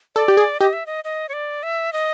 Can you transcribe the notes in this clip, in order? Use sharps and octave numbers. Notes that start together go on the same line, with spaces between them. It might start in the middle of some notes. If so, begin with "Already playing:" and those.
A4 D5
G4
G#4
G4 D#5
E5
D#5
D#5
C#5
D5
E5
D#5